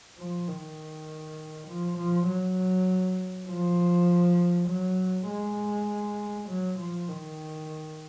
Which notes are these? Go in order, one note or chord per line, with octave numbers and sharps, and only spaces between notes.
F3
D#3
F3
F3
F#3
F3
F#3
G#3
F#3
F3
D#3